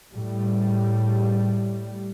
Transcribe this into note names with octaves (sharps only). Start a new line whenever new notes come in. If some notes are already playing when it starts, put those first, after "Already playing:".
A2 G3